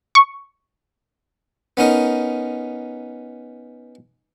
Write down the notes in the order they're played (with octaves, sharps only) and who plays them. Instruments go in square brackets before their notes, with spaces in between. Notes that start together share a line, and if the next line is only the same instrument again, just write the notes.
[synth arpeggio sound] C#6
[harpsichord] B3 C#4 D#4 A#4